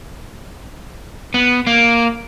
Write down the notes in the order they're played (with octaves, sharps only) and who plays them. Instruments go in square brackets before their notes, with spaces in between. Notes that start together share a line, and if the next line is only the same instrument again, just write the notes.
[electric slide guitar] B3
A#3